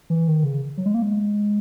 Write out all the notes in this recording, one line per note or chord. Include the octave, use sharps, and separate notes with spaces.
E3
D#3
C#3
F#3
G#3
A#3
G#3